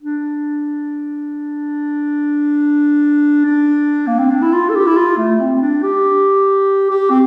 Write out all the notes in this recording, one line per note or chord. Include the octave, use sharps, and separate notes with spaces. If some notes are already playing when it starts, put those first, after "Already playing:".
D4
D4
A#3
C4
D4
E4
F4
A4
G4
E4
F4
A3
C4
C4
D4
G4
G4
C4